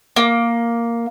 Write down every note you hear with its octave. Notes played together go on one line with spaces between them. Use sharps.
A#3